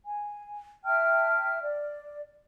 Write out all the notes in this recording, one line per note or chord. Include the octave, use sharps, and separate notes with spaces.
G#5
E5 G5 A5 F6
D5